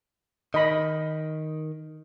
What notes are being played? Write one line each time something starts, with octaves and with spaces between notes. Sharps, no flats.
D#3 D#5 B5